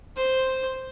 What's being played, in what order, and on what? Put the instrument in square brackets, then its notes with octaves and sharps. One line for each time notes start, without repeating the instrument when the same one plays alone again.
[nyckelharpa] C5